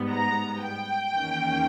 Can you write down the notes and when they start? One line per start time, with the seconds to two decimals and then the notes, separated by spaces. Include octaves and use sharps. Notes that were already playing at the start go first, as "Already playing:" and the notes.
Already playing: G#2 G3 B3
0.11 A#5
0.62 G5
1.14 E2 D#3 A#3 C#4